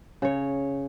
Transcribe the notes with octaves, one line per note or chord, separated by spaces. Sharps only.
C#3 C#5